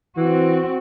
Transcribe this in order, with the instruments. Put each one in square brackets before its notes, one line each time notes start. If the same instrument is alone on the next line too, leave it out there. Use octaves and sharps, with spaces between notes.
[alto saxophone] E3 [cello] C4 F#4